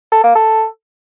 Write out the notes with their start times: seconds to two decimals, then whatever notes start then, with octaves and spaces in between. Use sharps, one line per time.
0.12 A4
0.24 A#3
0.35 A4